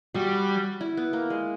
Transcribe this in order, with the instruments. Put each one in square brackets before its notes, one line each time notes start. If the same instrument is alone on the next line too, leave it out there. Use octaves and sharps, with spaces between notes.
[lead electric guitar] G3 [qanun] F#4
[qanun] E4
B3
A#3
G#3